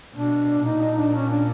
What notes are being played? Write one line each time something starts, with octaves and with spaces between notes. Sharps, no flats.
B2 D4
A#2 D#4
D#4
D4
C#4
D4